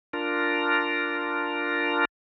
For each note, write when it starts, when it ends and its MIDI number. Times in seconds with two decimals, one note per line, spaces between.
0.13 2.05 62
0.13 2.05 65
0.13 2.05 70